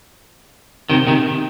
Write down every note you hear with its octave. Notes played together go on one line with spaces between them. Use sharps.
C3 D#3
C3 D#3